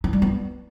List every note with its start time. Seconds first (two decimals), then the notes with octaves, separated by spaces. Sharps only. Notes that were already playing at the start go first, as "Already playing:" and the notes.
0.04 D#4
0.13 G3
0.22 B3